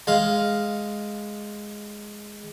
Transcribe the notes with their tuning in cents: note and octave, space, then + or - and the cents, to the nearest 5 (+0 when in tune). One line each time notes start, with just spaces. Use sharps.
G#3 +0 F5 +0